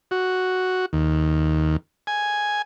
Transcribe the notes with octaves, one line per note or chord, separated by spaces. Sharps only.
F#4
D#2
G#5